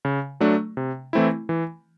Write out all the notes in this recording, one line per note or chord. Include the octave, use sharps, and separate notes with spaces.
C#3
F#3 A3 D4
C3
E3 A3 C4 E4
E3